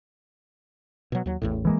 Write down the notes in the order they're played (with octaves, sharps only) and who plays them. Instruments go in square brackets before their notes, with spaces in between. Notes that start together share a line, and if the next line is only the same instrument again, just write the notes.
[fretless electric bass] B2 F#3
D#2 F#3
A1 E2 A2
[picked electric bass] E3 G#3 A#3